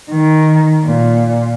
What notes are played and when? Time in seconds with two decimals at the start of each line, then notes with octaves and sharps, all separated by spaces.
0.10 D#3
0.85 A#2